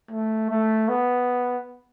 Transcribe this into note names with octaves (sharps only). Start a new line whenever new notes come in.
A3
A3
B3